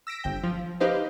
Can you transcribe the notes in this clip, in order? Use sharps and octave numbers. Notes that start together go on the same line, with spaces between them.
E6 A#6 B6 D7
G1 G5
F3
D#4 G4 B4 C5 D#5 F5